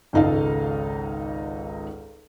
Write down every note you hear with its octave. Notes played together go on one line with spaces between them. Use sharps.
G#1 C#2 D#4 A4 F5